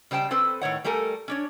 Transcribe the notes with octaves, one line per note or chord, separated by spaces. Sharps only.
C#3 G3 C5 G5 A5
C4 A4 B4 C5
A2 D#3 C#5 F#5
G3 A3 A4 A#4 G#5
C#4 D4 C#5